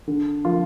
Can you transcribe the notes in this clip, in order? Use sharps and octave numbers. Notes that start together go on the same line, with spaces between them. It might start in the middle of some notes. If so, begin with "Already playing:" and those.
D3
F3 A#3 F4